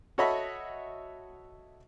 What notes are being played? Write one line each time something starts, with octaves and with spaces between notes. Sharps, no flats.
F#4 A4 C#5 D#5 E5 B5